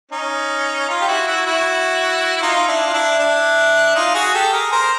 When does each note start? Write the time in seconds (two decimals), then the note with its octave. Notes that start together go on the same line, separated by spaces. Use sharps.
0.11 C#4 D#4
0.88 D#4 F4
1.01 G4
1.08 E4 F#4
1.27 E4 F#4
1.46 E4 F#4
2.37 E4
2.42 D#4 F4
2.68 D4 E4
2.87 F4
2.93 D4 E4
3.19 D4 E4
3.95 D#4 F4
4.14 F#4 G#4
4.34 G4 A4
4.52 G#4 A#4
4.72 A#4 C5